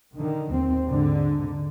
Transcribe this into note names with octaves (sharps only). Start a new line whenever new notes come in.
D3 D#3
D#2 C4
G#2 D3